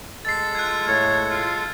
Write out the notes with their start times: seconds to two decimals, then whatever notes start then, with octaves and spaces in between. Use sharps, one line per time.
0.25 G#3 A4 A6 C7
0.55 F4 F#6 G#6
0.88 A2 C#5
1.30 F4